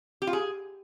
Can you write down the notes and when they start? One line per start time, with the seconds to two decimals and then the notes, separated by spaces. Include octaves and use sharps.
0.22 G4
0.27 F4
0.33 G#4